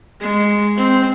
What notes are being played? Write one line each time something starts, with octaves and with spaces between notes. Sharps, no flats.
G#3
C4